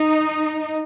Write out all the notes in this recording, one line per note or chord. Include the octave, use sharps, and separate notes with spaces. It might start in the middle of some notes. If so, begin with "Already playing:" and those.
Already playing: D#4